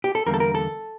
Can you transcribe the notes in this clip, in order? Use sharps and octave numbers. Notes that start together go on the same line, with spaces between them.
G4
A4
E2 D3 G3 A#3 A#4
A4
A#4
A4